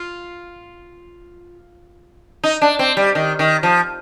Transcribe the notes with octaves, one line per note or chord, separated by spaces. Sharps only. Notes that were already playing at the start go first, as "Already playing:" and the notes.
Already playing: F4
D#4
D4
C4
G3
D#3
D#3
F3